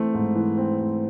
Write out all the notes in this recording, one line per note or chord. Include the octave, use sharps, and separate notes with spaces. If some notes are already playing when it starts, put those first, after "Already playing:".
Already playing: E3 A3 C4
G#2
E3
C4
A3